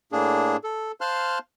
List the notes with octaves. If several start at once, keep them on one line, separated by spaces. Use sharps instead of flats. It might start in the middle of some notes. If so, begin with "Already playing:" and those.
A2 A#3 D4 G#4
A4
C5 F5 A5 C6 F6 F#6